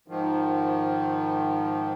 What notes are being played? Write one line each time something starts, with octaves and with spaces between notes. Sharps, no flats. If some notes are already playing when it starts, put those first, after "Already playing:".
G#2 D#3 F3